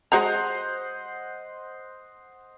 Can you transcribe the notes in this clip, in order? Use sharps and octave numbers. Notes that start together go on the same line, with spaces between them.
G#3 F#4 C5 D#5 F#5 A#5